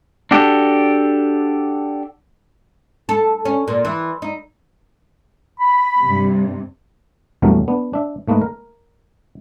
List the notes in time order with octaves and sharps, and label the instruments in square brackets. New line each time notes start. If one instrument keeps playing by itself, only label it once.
[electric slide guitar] D4 F#4 G4 A4
[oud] A4
C#4
A#2
E3
D#4
[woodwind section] B5
[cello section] G2 C3
[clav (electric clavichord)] A#1 E2 G2 F#3 A3 A#4
B3 D4
D4 E5
G#2 A3 A#3 B4 D#5
A#4